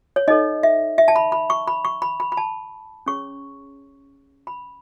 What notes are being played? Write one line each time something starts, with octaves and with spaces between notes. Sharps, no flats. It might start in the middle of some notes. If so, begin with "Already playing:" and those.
C#5
D#4 A4 C#5 D#5
E5
E5
A5
B5
B5
C#6
B5
C#6
B5
B5
B5
A5
C#4 G#4 C#5 C#6
B5